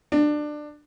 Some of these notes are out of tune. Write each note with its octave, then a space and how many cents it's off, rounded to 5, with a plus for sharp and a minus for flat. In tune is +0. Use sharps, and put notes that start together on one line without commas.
D4 +20